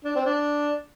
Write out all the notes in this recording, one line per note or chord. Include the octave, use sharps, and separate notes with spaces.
D4
C4
D4